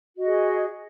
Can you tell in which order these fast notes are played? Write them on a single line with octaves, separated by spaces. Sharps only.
F#4 D#5 G#4